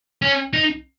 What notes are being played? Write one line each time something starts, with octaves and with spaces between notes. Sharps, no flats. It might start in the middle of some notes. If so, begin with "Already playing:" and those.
C#4
D#4